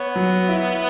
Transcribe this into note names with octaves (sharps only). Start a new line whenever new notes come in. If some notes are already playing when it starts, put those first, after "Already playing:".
Already playing: B3 C#5
F#3
E4